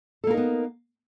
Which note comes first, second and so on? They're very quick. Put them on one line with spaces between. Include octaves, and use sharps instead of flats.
A4 A#3 A#4 D#4 B3